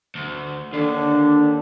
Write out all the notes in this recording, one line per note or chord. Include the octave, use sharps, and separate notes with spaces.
D2
D#2 D3 D4